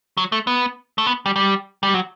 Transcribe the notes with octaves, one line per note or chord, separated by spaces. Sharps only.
F#3
A3
B3
A3
B3
G3
G3
G3
F#3